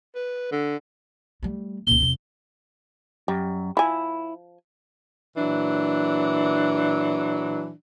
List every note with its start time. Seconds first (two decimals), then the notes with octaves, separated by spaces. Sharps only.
0.15 B4
0.51 D3
1.43 G3 A3
1.87 C#2 A#2 G7
2.01 E2 C3
3.28 F#2 G3
3.77 F3 E4 G#5
5.37 A#2 E3 F#3 D4